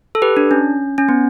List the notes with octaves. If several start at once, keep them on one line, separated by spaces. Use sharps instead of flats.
A4
G4 B4
D4
C#4
C#4
B3